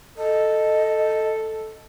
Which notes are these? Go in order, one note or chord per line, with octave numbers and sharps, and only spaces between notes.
A4 D#5